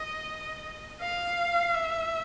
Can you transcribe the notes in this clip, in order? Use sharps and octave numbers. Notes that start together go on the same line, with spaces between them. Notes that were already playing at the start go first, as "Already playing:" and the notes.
Already playing: D#5
F5
E5